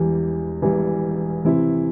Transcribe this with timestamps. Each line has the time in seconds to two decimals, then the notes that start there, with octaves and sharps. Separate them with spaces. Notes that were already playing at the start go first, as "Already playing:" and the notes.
Already playing: E1 E2 E3 G3
0.62 E1 E2 E3 G3
1.45 C3 E3 C4 E4